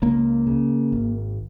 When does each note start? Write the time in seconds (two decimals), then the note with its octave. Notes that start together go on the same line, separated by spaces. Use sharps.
0.02 C#2 A#3
0.47 C#3
0.92 G#1